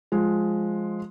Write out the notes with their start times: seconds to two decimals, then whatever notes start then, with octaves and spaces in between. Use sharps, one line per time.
0.12 F3 G#3